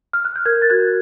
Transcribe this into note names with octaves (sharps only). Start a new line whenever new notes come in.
F6
F#6
G6
A#4 F#6 G#6
A6
F#4 F#6 G#6